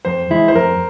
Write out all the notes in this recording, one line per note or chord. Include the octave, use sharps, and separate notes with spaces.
F2 C5
E3 G#3 E4
C5
F2 A#4